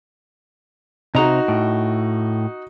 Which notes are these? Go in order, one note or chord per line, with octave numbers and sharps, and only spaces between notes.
C3 D#4 F#4 A#5
A2